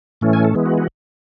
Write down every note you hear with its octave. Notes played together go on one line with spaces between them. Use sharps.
A2 E3 A3 C#4
G#5
A4
E3 G#3 B3
F#4
F#4